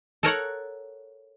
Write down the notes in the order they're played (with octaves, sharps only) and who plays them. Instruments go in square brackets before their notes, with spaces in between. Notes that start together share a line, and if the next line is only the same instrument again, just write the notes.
[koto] A4 A#4 C#5 F#5